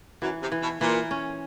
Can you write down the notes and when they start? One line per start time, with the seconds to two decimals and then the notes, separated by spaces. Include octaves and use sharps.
0.22 F#2 E3 F#3
0.41 C3
0.52 E3
0.62 B2
0.81 A#2 E3
1.11 C#4